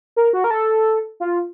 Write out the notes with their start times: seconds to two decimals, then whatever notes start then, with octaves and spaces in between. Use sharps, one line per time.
0.16 A#4
0.33 F#4
0.44 A#4
0.51 A4
1.20 F4